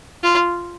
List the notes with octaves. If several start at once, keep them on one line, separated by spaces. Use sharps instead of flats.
F4